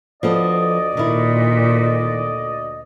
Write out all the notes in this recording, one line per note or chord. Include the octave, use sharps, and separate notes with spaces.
D2 F3 B3 A4 D5 D#5
A#2 D#3 E4